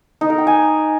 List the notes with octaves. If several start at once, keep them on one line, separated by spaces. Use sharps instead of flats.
D#4
A#4
G5
G#5